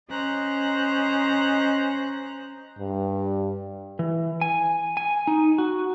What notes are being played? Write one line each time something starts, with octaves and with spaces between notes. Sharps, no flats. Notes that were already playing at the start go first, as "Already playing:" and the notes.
C#4 C5 D#5 A#5 F#6
G2
E3
G#5
G#5
D#4
F#4